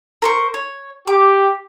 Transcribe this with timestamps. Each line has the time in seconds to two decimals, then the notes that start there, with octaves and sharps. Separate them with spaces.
0.22 A#4 C5 C#6
0.54 C#5
1.07 G4 D6